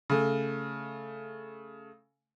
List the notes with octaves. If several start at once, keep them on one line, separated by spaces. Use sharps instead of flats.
C#3 A3